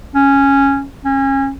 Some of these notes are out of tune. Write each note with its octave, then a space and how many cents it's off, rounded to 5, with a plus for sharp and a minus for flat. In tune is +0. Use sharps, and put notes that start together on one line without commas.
C#4 -5
C#4 -30